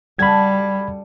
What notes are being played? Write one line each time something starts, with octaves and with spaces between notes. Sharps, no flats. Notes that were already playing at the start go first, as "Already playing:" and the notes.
C#3 G3 F#4 A4 B5 G#6